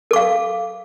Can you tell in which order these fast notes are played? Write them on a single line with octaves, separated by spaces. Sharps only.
A4 D6 F5